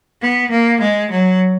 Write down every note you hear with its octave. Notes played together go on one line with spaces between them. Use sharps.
B3
A#3
G#3
F#3